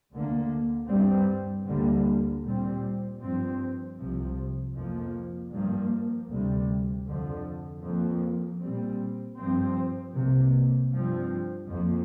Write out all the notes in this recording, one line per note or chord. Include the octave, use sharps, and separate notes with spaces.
D2 D3 A#3
G2 G3 C4
D2 D3 G3 A#3
A#2 G3 C4
G2 F3 C4
C2 C3 F3
F2 F3 A#3
G2 F3 A#3
D2 C3 G3
F2 D3 F3
F2 F3 A#3
A#2 G3 C4
G2 F3 C4
C2 C3 A#3
G2 F3 C4
F2 F3 A#3